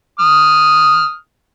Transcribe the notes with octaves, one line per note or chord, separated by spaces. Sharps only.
D#6 F6